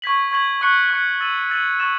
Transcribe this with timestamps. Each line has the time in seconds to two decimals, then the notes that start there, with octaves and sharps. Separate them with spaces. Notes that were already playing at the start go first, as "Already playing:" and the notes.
0.02 C#6 G#6 B6 F#7
0.31 C#6 G#6 B6 F#7
0.61 C#6 F#6 C#7
0.91 C#6 F#6 C#7
1.21 E6 A6 D#7 F#7
1.50 E6 A6 D#7 F#7
1.80 C#6 E6 A6 E7